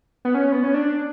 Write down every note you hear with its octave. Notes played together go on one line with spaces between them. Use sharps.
B3
C#4
B3
C#4
D4